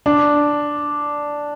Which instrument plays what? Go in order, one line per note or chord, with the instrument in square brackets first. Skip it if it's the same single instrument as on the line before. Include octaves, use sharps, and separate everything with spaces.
[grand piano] D4